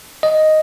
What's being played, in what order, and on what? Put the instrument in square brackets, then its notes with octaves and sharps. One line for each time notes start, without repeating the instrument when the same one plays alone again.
[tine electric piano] D#5